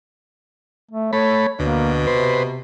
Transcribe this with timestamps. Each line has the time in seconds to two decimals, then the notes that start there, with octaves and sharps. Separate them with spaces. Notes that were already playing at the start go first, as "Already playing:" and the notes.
0.91 A3
1.13 A3 C#5 B5
1.59 D2 B2 A#3
2.07 C3 B4 C5